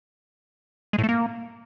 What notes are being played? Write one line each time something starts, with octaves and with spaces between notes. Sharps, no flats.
G#3
A2
A3
A#3